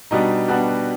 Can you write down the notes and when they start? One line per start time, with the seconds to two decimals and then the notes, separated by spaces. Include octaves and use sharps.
0.11 B2 G3 B3 D4 D#4
0.48 B2 G3 B3 D4 F#4